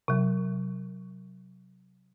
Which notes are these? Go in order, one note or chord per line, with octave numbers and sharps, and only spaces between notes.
C3 F#3